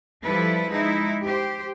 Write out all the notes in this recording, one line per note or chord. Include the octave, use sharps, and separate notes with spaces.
F3 G3 E4 A4 B4
G#3 D#4 E4
G4 C5